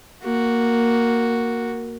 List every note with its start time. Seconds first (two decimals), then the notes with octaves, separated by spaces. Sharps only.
0.23 A#3 F#4